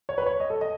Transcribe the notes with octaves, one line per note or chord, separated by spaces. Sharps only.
C#5
B4
C#5
D#5
A4
D#5